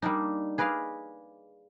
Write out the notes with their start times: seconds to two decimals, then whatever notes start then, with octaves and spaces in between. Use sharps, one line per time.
0.02 G3 A#3 D4 D#4
0.58 G#4 B4 D5 D#5 F5